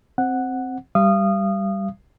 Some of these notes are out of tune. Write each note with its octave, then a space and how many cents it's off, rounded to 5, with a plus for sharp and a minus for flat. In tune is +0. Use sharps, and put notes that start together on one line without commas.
C4 +0 F#5 +0
G3 +0 F5 -35 D#6 -20